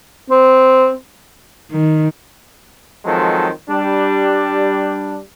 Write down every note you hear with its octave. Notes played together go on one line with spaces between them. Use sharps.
C4
D#3
D#3 F3 F#3 G#3 C4 A4
G3 D4